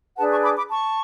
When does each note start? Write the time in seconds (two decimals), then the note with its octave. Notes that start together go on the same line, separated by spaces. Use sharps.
0.17 D4 G#4 B4 F#5 A5
0.30 A5 C#6
0.44 B5 D6
0.57 B5 D6
0.70 A5 C#6